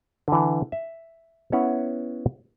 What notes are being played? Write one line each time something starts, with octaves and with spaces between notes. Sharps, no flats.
D3 E3
E5
B3 C#4 E4 C#5 F#5